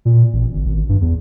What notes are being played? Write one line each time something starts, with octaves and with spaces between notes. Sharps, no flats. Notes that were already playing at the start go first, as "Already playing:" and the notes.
A#2
A1
G1
G#1
G2
E2